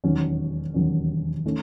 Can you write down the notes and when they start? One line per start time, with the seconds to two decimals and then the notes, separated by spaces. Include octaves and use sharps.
0.04 E1 D#2 D#3 F#3 C#4
0.74 E1 D#2 D#3 F#3 C#4
1.45 D#3 A3 C#4